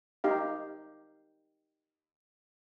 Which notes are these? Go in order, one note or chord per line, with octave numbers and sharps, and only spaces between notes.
D#4 G4 F5